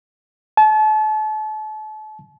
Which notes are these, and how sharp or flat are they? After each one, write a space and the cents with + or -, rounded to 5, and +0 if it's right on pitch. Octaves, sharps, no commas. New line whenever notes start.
A5 -35